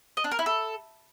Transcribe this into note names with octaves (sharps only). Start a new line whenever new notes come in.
D#5
D4
A#4
E4
A4